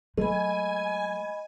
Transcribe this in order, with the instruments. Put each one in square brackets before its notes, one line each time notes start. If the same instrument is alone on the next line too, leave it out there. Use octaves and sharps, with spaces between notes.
[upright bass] F#3 G#3 [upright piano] A3 [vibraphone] D#5 B5 [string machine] G#5